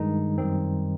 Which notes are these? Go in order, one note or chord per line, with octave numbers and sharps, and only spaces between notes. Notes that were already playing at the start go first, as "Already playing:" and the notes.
Already playing: G2 D#3 G#3 D#4
F#2 D#3 G3 C4